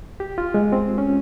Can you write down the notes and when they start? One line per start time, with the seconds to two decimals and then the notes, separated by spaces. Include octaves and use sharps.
0.20 G4
0.38 F4
0.54 G#3
0.72 C4
0.98 C#4